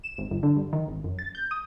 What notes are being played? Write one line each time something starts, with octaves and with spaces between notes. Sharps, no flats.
E7
G#1
G1
D3
G2
D#3
G#1
F#2
A6
G6
D#6